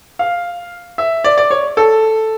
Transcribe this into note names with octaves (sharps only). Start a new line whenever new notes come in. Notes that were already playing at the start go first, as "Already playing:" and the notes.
F5
E5
D5
D5
C#5
A4